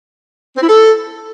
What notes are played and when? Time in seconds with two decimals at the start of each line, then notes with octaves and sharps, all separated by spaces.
0.56 C4
0.62 E4
0.68 A4